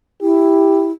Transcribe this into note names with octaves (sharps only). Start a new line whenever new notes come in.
E4 G4